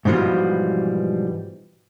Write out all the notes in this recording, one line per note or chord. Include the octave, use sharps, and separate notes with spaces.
G#2 B2 E3 F3 G3